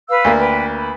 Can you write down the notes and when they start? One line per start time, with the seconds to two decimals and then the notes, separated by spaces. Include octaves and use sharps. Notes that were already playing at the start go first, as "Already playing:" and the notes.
0.09 B4 F5 E6
0.24 D2 A#3
0.39 B4 G5
0.79 B5